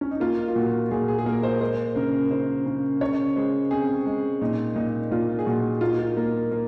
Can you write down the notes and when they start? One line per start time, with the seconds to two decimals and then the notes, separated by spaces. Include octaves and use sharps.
0.01 C#4
0.11 D#4
0.20 A#3 F4
0.48 F4
0.55 A#2 F#4
0.91 A#2 G#4
1.08 G#4
1.19 G#4
1.26 A#3 A#4
1.43 C5
1.61 G#3 C5
1.95 C#3 A#4
2.31 C#3 C5
2.66 C#3
3.01 C#3 C#5
3.36 G#3 C5
3.71 C4 G#4
4.06 G#3
4.41 A#2 D#4
4.76 A#2 D#4
5.11 A#2 F4
5.39 G#4
5.46 A#2 F#4
5.81 A#3 F4
5.91 D#4
5.99 F4
6.17 A#3
6.51 A#3